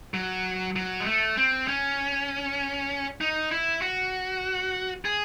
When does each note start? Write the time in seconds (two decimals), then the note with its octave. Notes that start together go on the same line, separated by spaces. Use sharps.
0.14 F#3
0.76 F#3
1.00 G#3
1.06 A3
1.37 C4
1.68 C#4
3.21 D#4
3.51 E4
3.82 F#4
5.05 G#4